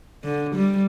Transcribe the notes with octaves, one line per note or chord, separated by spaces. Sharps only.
D3
G3